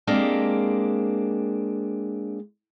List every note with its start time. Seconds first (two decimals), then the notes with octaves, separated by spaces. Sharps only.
0.07 G#3 A#3 C4 D4 G4